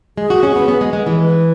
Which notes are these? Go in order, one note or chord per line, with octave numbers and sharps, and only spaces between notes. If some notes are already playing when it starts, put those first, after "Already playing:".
G#3 G#4
F#4
C#4
B3
B3
G#3
G#3
E3
B4